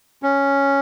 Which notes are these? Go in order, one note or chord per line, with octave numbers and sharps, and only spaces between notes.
C#4